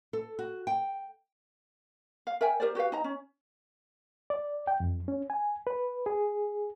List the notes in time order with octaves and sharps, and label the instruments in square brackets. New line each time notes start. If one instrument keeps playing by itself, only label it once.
[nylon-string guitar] A4
F#4
G5
[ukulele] F5
A#4 E5 G5 G#5
G4 A#4 C5 D5
F#4 G4 B4 F5
D#4 D#5 A#5
C#4
[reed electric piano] D5
G5
F2
C#4
G#5
B4
G#4